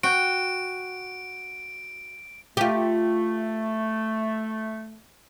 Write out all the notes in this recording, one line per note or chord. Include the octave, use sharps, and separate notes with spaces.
F#4 G5 D7
A3 F4 G4